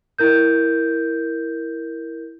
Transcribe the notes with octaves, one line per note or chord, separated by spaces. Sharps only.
E4 A#4 G6